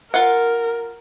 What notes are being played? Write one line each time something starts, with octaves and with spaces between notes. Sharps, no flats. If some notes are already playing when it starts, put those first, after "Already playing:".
F4 A#4 F5 F#5